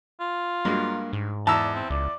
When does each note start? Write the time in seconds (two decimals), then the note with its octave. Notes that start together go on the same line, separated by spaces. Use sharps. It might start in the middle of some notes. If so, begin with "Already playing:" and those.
0.20 F4
0.65 G2 F#3 G#3 A#3
1.13 G#2
1.47 E2 D5 A5 A#5 E6
1.75 C4
1.90 C#2 D5